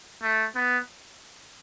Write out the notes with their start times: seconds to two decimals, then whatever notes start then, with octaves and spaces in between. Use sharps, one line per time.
0.22 A3
0.55 B3